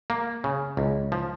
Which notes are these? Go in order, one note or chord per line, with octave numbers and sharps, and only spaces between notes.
A#3
C#3
C#2
F3